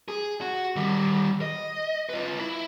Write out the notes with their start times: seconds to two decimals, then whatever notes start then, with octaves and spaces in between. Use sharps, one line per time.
0.08 G#4
0.41 F#4
0.76 D#3 G3
1.42 D#5
2.09 F4 B4
2.39 E4